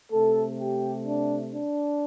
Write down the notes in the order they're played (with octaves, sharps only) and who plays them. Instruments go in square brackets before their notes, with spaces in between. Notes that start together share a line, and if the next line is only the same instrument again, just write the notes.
[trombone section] C3 A3 A4
G4
D4
D4